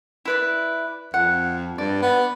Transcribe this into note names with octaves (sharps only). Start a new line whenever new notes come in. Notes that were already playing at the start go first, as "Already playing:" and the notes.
E4 B4 D5
F2 F#5
G2 D5
B3